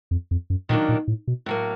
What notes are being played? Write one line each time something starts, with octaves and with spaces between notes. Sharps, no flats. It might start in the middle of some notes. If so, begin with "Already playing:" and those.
F2
F2
F#2
A#2 D#3 F#3 A#3 D4
A#2
A2
B2
A2 F#3 A#3